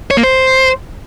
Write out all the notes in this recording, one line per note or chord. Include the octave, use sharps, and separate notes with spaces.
C#5
A#3
C5